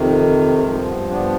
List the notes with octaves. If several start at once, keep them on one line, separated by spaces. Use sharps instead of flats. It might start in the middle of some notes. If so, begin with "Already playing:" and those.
Already playing: F2 C3 D#3
G2 F3 G#3
B3
B3 D4